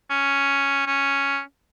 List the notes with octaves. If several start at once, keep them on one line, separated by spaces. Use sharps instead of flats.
C#4
C#4